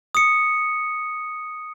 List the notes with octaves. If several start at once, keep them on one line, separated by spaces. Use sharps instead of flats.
D#6 C#7